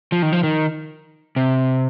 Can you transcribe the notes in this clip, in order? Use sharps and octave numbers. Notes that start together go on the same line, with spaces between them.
F3
D#3
F3
D#3
C3